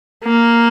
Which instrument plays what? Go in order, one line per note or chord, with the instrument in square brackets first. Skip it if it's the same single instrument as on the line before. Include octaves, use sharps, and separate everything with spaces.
[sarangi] A#3